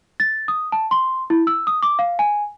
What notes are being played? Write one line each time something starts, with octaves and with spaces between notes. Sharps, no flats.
A6
D#6
A5
C6
E4
E6
D#6
D6
F5
G#5